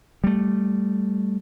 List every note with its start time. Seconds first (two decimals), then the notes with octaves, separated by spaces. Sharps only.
0.24 G3 A3